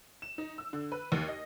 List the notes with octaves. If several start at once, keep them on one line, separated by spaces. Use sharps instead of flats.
E7
D#4
E6
D3
B4
D#2
D#5